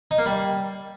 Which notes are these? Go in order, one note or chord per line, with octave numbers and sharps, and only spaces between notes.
D#4
A#3
G3